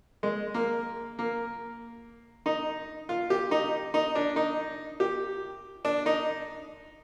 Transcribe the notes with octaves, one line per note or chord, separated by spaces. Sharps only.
G#3
A#3
A#3
D#4
F4
G4
D#4
D#4
D4
D#4
G4
D4
D#4